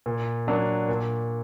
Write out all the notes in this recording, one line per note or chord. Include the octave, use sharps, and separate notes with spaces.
A#2
F#3 A#3 D4
A#2